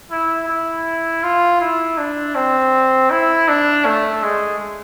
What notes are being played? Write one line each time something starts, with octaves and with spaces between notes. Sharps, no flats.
E4
E4
F4
E4
D4
C4
E4
D4
A3
G#3